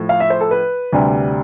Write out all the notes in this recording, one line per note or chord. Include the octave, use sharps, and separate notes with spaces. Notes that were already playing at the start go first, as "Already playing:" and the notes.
Already playing: A2 F3 A3
F5
E5
C5
A4
B4
D2 C3 G3